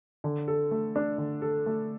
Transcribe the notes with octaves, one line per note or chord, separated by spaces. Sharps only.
D3
A4
A3
D4
D3
A4
A3